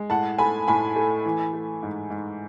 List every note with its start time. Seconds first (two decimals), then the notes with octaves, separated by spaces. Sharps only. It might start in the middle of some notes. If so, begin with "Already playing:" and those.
Already playing: G#3
0.10 A2 F#5 A5
0.38 A3 G#5 B5
0.68 A2 G#5 B5
0.96 A3
1.25 E3
1.53 A3
1.83 G#2
2.10 G#2